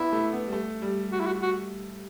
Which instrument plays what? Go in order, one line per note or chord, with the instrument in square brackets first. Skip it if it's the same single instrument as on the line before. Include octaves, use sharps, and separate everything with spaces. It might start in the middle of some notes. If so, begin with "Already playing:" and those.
Already playing: [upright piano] B3 D4 [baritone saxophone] E4
[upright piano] A3
B3
G3
A3
G3
[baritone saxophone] F#4
E4
F#4
F#4